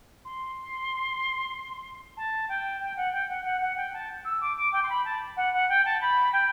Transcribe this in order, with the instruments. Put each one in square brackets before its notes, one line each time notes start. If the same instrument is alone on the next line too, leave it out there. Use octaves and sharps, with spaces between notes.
[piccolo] C6
A5
G5
G5
F#5
G5
F#5
F#5
F#5
G5
A5
E6
D6
D6
G5
C6
B5
A5
F#5
F#5
G5
A5
B5
G5